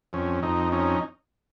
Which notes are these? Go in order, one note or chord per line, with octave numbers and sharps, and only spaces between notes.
F2 C#4
F2 D#4
C#4 D#4